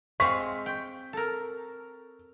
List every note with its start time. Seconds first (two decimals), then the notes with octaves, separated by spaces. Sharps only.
0.20 G#3 C4 F5 C#6 B6
0.66 G5
1.13 A4 A#4